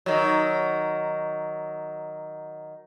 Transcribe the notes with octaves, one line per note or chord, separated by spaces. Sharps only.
D#3 F#3